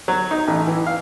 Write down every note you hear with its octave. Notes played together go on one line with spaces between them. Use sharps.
F#3
D#4
A1
E3
F5